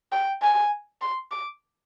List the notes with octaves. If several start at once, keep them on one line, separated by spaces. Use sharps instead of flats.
G5
G#5
C6
D6